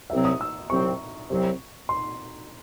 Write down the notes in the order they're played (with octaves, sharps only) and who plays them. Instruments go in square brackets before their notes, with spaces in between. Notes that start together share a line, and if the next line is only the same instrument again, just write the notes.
[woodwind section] C2 C3 F#3 C4 [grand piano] E5
[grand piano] D#6
E6
[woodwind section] C2 C3 F#3 C4 [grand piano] C#6
[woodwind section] C2 C3 F#3 C4
[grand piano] C6